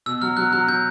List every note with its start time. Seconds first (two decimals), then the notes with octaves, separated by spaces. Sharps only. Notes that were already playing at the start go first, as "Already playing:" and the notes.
0.06 B2 E6
0.22 F#3 F6
0.37 F#3 F#6
0.53 F#3 F#6
0.68 F#3 G6